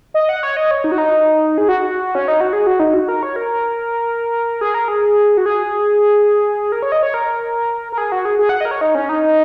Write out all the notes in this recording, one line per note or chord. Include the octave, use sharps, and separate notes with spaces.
D#5
F#5
C#5
D#5
C#5
D#4
F#4
D#4
G#4
F#4
C#4
D#4
F#4
G#4
F#4
D#4
F#4
A#4
C#5
A#4
G#4
A#4
G#4
F#4
G#4
A#4
C#5
D#5
C#5
A#4
A#4
G#4
F#4
G#4
G#4
F#5
D#5
A#4
C#5
D#4
C#4
D#4